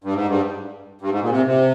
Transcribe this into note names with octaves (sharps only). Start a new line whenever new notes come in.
G2
G#2
G2
G2
G#2
A#2
C3
C3